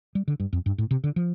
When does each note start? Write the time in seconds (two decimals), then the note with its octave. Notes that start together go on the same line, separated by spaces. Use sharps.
0.15 G3
0.28 D3
0.40 G2
0.53 F2
0.66 G2
0.78 A2
0.91 C3
1.04 D3
1.16 F3